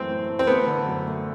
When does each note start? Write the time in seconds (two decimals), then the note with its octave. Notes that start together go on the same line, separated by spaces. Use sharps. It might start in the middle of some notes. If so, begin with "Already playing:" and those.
Already playing: F#2 E3 A3 C4
0.09 A2
0.29 A3
0.39 C4
0.47 A3 B3
0.67 D3
0.86 F#2
1.06 A3